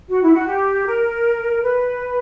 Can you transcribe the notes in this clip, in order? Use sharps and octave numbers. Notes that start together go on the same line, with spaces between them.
F#4
E4
F#4
G4
A#4
B4